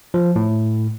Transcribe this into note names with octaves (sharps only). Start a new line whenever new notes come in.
F3
A2